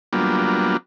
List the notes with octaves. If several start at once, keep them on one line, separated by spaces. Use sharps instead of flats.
F#3 G3 A#3 B3 D4 F4